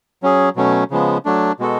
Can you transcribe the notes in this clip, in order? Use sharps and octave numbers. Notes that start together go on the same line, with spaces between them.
F#3 C#4 G#4
B2 F#3 A3 C#4
C#3 F3 G#3 B3
F#3 A3 D4
B2 G#3 B3 F#4 A4